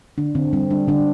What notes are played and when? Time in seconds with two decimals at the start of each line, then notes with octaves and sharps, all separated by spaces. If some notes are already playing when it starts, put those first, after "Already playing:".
0.18 D3 D4
0.35 D3 C4
0.53 G3 C4
0.71 G3 D4
0.88 D3 D4